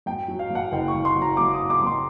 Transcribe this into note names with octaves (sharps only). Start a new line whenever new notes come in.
F#2 G5
F#3
F5
F#2 F#5
F#1 G5
C#6
F#1
C6
F#3
A#5
F#2 D6
D#6
F#1
D6
F#2
C6